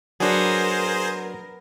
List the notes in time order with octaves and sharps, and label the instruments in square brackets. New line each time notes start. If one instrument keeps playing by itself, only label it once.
[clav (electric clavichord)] F#3 D4 [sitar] B3 [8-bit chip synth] G#4 C5 [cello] A#4